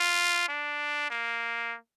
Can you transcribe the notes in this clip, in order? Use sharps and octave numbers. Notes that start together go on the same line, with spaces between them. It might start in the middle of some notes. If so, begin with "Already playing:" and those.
Already playing: F4
D4
A#3